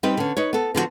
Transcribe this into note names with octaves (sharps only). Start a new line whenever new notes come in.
G3 C4 D#4 G4 B4
D3 C#4
D#4 B4 C#5
B3 A4
D3 F3 B3 F#4